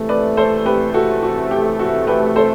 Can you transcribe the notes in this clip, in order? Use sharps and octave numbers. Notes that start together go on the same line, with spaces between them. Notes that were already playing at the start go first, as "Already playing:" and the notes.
Already playing: C3 E3 A3
B4 D5
A4 C5
G4 B4
F#4 A4
F#4
G4
F#4 A4
G4 B4
A4 C5